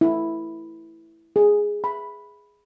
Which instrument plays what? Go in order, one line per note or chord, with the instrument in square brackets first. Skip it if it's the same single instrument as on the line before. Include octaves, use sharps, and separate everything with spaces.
[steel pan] E4
G#4
B5